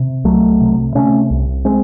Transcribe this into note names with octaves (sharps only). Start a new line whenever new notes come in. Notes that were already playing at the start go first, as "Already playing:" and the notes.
Already playing: C3
C2 F#3 A3
C3
C3 A3 C#4
C2
G#3 C4